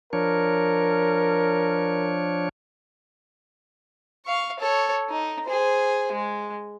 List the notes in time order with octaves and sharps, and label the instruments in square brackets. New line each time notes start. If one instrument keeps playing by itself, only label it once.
[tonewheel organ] F3 D4 C#5 [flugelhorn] A#4
[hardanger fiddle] F5 C#6
A4 C#5
D#4
G#4 C5
G#3